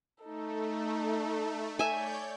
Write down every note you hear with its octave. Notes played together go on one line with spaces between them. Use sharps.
A3 D#4 A4
C#5 D5 E5 G#5 G6